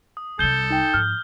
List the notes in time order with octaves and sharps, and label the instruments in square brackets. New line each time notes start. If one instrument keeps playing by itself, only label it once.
[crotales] D#6
[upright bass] C2 G3 [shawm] A4 [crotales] G6 G7
[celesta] D#4 G5
[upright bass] G#2 F3 [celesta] F6